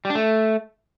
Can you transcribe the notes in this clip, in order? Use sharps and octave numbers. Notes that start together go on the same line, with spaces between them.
G3
D4
A3